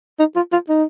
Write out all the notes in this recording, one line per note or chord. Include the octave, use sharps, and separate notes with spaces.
D#4
F4
F4
D#4